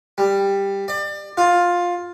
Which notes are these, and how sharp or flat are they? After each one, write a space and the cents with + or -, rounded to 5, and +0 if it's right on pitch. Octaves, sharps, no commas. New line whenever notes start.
G3 +10
D5 +30
F4 +10